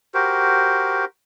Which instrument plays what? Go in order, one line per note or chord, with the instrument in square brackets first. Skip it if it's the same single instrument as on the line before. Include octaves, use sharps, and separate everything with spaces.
[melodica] F#4 G4 A#4 C5